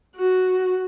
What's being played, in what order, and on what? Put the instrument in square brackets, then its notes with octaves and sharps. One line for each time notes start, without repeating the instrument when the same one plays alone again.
[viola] F#4